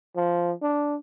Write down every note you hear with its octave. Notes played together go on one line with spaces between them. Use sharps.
F3
D4